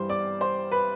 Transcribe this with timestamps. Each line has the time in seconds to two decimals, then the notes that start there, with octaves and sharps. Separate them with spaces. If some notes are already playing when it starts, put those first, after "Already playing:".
Already playing: G2 E3 G3 C5 C6
0.09 D5 D6
0.41 C5 C6
0.72 B4 B5